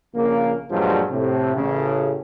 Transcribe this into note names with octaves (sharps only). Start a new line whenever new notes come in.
A#1 C#3 A#3
G2 A#2 F3 F#3 G#3
A2 C3
A1 C#3